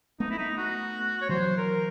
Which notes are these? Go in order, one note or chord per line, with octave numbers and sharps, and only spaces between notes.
A3 B3 D#4
E4
D#4
F#4
C#5
E3 F#3 C5
A#4